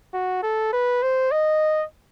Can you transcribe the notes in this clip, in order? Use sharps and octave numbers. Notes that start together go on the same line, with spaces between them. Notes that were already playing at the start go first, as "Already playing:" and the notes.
F#4
A4
B4
C5
D#5